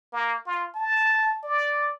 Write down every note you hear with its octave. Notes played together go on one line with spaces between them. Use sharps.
A#3
F4
A5
D5